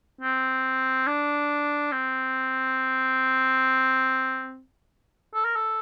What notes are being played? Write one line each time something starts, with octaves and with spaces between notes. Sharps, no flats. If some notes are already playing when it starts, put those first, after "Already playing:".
C4
D4
C4
A4
A#4
A4